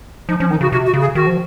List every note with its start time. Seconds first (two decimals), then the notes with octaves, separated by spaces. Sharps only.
0.29 F3 D#4
0.40 F3 C#4
0.50 D#3 D#4
0.61 C#3 F#4
0.72 C3 F#4
0.86 F#4
0.94 C#3
1.01 G#4
1.15 D#3 F#4
1.27 F3